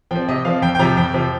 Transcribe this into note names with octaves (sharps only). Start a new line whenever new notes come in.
F3 C4 G5
C3 D#5
F3 C4 F5
F2 G5
G5
C3 F3 A#5
F2 G5
C3 F3